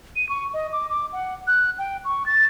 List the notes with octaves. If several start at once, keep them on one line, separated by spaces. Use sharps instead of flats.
D#7
C#6
D#5
D6
D6
F#5
F#6
G5
C#6
A6